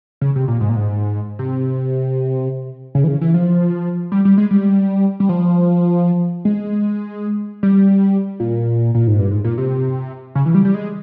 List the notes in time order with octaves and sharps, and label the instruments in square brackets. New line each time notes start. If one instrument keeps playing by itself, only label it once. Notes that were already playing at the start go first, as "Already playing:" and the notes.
[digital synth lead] C#3
C3
A#2
G#2
A#2
G#2
C3
C#3
E3
C#3
E3
F3
G3
G3
G#3
G3
G3
F3
G#3
G3
A#2
A#2
G#2
G2
G#2
A#2
C3
C#3
E3
G3
G3
G#3